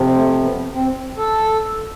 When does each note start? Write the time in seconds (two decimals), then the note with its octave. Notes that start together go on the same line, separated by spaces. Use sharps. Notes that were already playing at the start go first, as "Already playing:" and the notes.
Already playing: F2 C3 F3
0.14 A3
0.43 B3
0.74 C4
1.17 A4